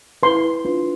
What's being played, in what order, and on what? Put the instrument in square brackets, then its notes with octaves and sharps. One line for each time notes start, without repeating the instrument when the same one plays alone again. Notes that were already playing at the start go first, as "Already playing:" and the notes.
[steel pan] E4 B4 C6
D4 F4 B4